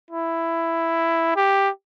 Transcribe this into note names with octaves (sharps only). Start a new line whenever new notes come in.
E4
G4